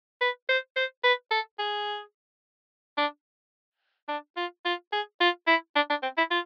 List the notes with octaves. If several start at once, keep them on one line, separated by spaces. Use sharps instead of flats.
B4
C5
C5
B4
A4
G#4
D4
D4
F4
F4
G#4
F4
E4
D4
D4
C4
E4
F4